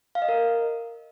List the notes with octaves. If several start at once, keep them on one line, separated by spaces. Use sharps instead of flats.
F5
D#5
A#4